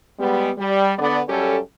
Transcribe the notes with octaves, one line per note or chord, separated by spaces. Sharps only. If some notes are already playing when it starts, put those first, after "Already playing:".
G3 G#3 B3
G3
D3 B3 D5
F#2 G3 C#4 G4 A4